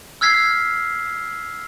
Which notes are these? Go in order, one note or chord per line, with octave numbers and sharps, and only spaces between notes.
E6 F6 G#6 B6 C7